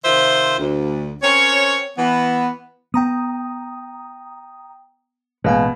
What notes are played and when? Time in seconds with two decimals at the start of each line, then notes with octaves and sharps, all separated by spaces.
0.04 C3 D#3 F4 C5 E5
0.59 D2
1.23 C4 C#4 A#4 C#5
1.98 E3 B3
2.94 B3 G5 A#5 D#6
5.44 A1 B2 G#3 A#3 F5 G#5